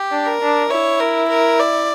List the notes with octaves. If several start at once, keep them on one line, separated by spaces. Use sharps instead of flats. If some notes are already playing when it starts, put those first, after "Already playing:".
Already playing: G4
D4
A#4
D4
E4 C#5
A#4
A#4
D5